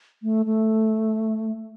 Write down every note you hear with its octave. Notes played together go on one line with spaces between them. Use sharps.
A3
A3